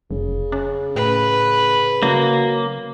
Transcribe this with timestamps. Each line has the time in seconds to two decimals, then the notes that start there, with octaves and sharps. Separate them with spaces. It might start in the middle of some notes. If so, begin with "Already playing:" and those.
0.11 F1 C#3
0.52 C#4
0.96 A2 B4
2.03 C#3 F#3 A#3